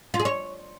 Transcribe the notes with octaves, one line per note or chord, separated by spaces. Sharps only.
F4
G#4
C#5